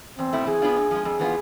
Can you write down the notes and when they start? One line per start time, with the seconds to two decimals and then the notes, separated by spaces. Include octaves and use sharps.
0.18 E2 C4
0.33 B2 A3 E4
0.47 E3 G#4
0.62 B3 D4 F4
0.76 A2
0.91 F3 G#3
1.05 F2 G#4
1.20 E3 B3 D4 F4